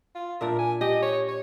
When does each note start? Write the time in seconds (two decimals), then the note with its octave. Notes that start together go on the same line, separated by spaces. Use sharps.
0.15 F4
0.41 A#2 D4 A#4 E5
0.59 G#5
0.81 G4 D#5
1.03 C#5
1.28 C#5